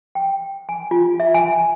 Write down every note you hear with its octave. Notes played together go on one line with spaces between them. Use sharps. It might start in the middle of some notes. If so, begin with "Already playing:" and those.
G5
G#5
F4
E5
G#5